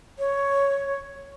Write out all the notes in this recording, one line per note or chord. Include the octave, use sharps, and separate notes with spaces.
C#5